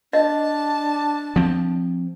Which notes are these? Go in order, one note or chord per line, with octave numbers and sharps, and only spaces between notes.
D4 D#5 A5
F3 C4